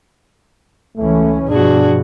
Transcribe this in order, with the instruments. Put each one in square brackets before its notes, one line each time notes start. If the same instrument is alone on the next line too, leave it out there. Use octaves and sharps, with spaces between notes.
[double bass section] C#2 E3 C#4 [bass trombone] A3
[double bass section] G2 B2 F3 [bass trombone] D4 [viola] F#4 G#4